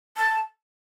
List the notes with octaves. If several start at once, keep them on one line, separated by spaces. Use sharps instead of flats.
A5